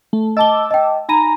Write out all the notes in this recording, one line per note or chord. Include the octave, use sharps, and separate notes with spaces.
A3
D#5 A5 D6 E6 G7
D#5 G5
D#4 G#5 A#5 B5 D#7